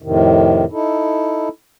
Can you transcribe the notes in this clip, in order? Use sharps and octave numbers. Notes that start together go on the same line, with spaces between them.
F2 A2 C3 D#3
D#4 E4 A4